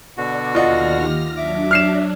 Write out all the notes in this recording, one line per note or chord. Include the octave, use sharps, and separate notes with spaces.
B2 D3 F#4 D5
D#2 F4 D5 D#5 F#5 F6 A#6
G4
F#3 D4 E5 D6
F6 C7 E7